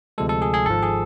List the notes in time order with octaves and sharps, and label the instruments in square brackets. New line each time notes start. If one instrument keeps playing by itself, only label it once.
[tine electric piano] D2 C3 F3 G#3 A4
A4
G#4
G#4
G#1 G#2 F3 A4
G#4